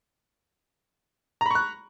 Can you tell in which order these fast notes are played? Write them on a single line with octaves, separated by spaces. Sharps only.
A#5 B5 C#6 F#6